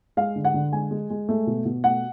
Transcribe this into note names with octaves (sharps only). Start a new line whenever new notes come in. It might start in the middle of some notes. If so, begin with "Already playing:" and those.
G#3 F5
D3
F#5
D3
G#3 G#5
G#3
G#3
A3
B2
B2
A3 F#5